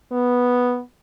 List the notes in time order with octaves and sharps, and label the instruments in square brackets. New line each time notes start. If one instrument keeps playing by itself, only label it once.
[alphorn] B3